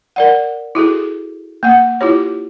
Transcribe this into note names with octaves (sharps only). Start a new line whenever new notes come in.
A#4 D5 F#5
E4 F#4 G#4 A4
A#3 F#5
E4 F4 G4 C#5